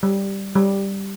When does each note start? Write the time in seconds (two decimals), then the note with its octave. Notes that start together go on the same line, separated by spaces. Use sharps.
0.03 G3
0.55 G3